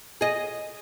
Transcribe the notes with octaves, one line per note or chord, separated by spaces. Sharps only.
G#4 D#5